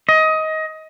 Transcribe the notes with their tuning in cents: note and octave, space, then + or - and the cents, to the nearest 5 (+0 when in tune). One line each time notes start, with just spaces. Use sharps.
D#5 +20